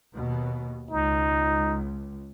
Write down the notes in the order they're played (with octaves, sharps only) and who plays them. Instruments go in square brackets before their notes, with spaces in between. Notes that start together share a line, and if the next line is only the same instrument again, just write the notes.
[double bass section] D#2 B2
[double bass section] C#2 [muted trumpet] D#4